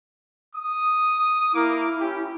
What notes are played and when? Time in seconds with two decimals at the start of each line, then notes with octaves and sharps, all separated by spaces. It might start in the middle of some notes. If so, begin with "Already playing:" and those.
0.56 D#6
1.54 A#3 E4 A#4 D6
2.01 C#4 G4